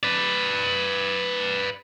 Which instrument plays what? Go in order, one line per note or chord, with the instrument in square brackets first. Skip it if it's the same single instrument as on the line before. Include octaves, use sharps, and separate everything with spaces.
[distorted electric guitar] B4 D5